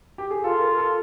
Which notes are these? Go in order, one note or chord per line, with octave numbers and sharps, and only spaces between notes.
G4
G#4
F4 A4
A#4
A4